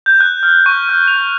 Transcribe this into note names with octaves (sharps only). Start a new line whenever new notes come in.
G6
F#6
F6
C#6
F6
F7